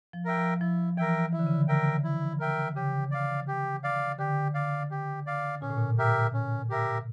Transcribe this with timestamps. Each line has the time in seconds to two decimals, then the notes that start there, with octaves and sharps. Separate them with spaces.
0.13 F3
0.25 A#4 E5 G5
0.37 F3
0.61 F3 E4
0.97 E3 A#4 E5 G5
1.33 E3 E4
1.39 D3
1.47 C#3
1.54 D3
1.68 A#4 E5 G5
2.04 E4
2.39 A#4 E5 G5
2.76 C#3 G4
3.11 D5 F5
3.48 G4
3.84 D5 F5
4.19 D3 G4
4.54 D5 F5
4.91 G4
5.27 D5 F5
5.62 A#2 C#4
5.70 A2
5.78 A#2
5.98 G4 A#4 E5
6.34 C#4
6.69 G4 A#4 E5